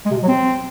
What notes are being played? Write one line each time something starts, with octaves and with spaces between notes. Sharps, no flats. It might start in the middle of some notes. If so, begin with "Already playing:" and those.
G#3
C3
B2
F#3
C4